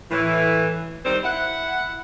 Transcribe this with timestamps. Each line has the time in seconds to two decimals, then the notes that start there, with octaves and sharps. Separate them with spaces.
0.11 A2 E3
1.04 D#3 G3 C4 C5
1.23 E4 F#5